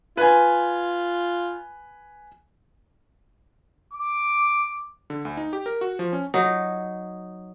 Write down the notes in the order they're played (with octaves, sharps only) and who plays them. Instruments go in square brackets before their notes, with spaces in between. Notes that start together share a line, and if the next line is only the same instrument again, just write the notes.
[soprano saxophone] F4 [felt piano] B4 G#5
[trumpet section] D6
[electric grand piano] D3
D2
D#4
G4
A#4
F#4
F3
C#4
[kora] F#3 D#4